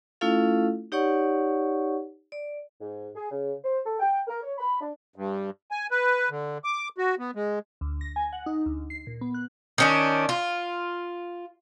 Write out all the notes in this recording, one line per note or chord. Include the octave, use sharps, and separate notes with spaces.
A3 C#4 E4 F4 A4 F5
D#4 G4 C#5 D5 F#5 C#6
D5
G#2
G#4
C#3
C5
A4
G5
A#4
C#5
B5
D4
G2
G#5
B4
D3
D6
F#4
B3
G#3
D2
A#6
G#5
F#5
D#4
D2
C7
A#2
B3
F#6
D#3 C#4 D4
F4